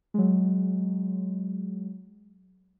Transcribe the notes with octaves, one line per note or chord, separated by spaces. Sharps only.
F#3 G#3